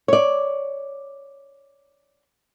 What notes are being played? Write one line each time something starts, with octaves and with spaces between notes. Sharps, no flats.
C#5 D5